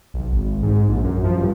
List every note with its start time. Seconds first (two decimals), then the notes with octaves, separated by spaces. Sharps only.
0.14 B1
0.31 G#1
0.63 G#2
0.88 A#1
1.04 F#2
1.24 F3
1.38 G2